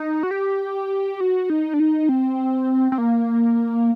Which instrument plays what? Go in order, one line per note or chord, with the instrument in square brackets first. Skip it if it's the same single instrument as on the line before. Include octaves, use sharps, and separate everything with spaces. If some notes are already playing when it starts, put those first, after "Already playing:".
Already playing: [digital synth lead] D#4
F#4
G4
F#4
D#4
D4
D#4
C4
C4
A#3